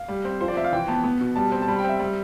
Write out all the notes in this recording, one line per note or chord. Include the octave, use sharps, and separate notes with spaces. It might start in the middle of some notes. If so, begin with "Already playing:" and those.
Already playing: F5
G3
C4
F3 C5
D5
C4 E5
F5
E3 G5
B3 A5
B3
B2
G3 A5
C4
A5
G3 B5
G5
C4 E5
G3